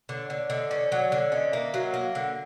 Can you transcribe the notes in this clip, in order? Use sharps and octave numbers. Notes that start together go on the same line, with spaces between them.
D3 C#5
D3 D5
D3 D#5
C#4 D5
D5
F#3 C#5
D3 D5
C#4 D#5
A#3 E5
F#3 F5
A#3
D3 F#5